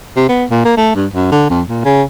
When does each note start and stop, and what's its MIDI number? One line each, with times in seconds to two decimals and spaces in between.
0.16 0.27 48
0.29 0.44 59
0.50 0.60 46
0.65 0.75 58
0.77 0.95 57
0.95 1.07 43
1.13 1.29 42
1.31 1.48 50
1.50 1.62 41
1.68 1.84 46
1.85 2.03 49